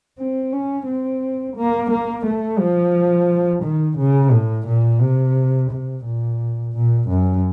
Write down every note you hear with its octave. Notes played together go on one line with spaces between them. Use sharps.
C4
C#4
C4
A#3
A#3
A3
F3
D#3
C#3
A2
A#2
C3
C3
A#2
A#2
F#2